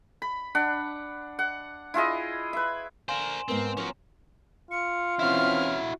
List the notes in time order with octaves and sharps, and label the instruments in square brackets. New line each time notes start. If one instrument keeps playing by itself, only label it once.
[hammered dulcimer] B5
D4 F#5
F#5
E4 F4 G#4 D#5
B4 E5
[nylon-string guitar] D3 [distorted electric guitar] A#4 C5 [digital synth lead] F5 [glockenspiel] G#5 C6 E7
[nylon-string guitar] G#2 B3 [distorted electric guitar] C4 [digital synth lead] A#4
[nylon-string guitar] F3 [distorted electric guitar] C#4 F#4 [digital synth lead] A#4
[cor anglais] F4 [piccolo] C#7
[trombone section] E3 C4 C#4 [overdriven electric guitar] E4 F#4 [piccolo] F6